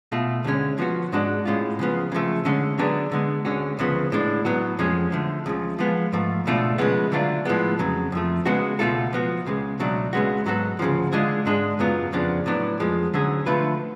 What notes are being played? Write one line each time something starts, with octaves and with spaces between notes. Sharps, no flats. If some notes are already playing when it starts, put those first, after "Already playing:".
B2 A3 F4
D2 D3 G#3 C#4
F3 B3 F#4
G#2 G#3 D4 F#4
A2 G#3 C#4 F4
C#3 F3 B3
C#3 F3 A3
D3 G#3 C#4
D3 F#3 B3 D4 G#4
D3 G#3 B3
D2 D3 G#3 C#4 F#4
D2 C#3 F3 B3
A2 G#3 D4
A2 F#3 B3 F#4
F2 F3 G#3 C#4 G#4
D3 F3 A3
C#2 C#3 F3
F3 G#3 B3 F4
G#2 F3 A3
C#2 B2 A3 D4 F4
C#3 F3 G#3 B3
D3 F#3 A3 D4 F4
A2 F3 G#3 B3
F2 C#3 F#3
F2 F3 A3
C#3 G#3 B3 F#4 A4
C#2 B2 A3 F4 A4
F3 B3 F#4
C#2 C#3 G#3
C#2 B2 F#3 A3 D4
C#2 C#3 G#3 B3 F#4
G#2 F#3 B3 F#4 A4
D2 C#3 F3
D3 G#3 D4 F4 G#4
G#2 G#3 D4 G#4
F#2 C#3 F#3 B3 F4
F2 C#3 F3 B3 D4
A2 F#3 B3 D4
F2 F3 G#3
D2 D3 F#3 C#4 G#4
D3 F3 A3 F4 B4